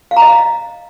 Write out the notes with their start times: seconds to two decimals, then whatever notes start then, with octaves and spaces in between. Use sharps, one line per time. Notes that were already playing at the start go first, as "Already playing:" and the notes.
0.11 F5
0.17 A#5
0.22 D#5
0.27 F5